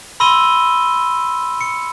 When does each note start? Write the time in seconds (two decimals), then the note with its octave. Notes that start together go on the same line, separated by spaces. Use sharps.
0.20 B5 C6 E6 A#6 D#7 G7
1.61 C#7